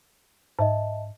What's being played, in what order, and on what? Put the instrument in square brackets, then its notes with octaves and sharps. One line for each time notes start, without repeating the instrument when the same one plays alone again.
[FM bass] G#2 [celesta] D#5 E5 A5